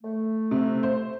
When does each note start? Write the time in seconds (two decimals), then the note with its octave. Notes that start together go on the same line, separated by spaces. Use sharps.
0.02 A3
0.51 C3
0.83 C5